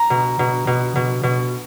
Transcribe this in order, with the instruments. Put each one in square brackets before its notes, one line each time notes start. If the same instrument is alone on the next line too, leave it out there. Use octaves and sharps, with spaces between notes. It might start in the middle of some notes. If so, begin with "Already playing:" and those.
Already playing: [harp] A#5
B2
B2
B2
B2
B2